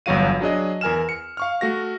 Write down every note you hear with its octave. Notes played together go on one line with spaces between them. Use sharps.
G1 E2 F#3 F#4 F5 D#7
F#3 D4 G#4 D#5
E2 A#4 G#5 F6 E7
C#7
F5 C#6 F6
A3 F#4 A#6